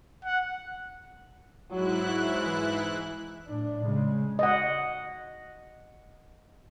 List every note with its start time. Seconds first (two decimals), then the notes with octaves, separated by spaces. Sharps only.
0.25 F#5
1.71 G#2 F#3 E4 F#6
2.43 E3
3.48 A2 D4
3.86 C#3 G#3
4.39 D#5 F#5